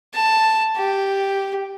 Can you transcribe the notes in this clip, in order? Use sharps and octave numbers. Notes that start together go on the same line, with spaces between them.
A5
G4